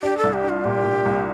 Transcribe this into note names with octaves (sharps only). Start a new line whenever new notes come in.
D4 G4
A4
C2
G4
D4
F4
A#2 G4
A#2
C2